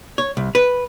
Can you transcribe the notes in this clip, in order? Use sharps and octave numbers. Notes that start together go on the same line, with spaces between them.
C#5
C2
B4